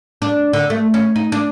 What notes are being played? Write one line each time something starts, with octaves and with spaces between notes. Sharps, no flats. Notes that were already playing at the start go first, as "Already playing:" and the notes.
D4
D3
A3
C#4
D#4
D4